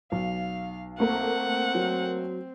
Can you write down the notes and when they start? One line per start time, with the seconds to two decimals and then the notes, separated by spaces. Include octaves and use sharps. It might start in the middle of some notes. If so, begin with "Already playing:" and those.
0.12 B1 F5
1.00 A3 A#3 C4 F#5
1.75 F#3